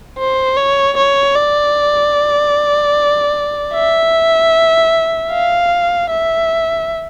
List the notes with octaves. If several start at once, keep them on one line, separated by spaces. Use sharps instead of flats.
C5
C#5
C#5
D5
E5
F5
E5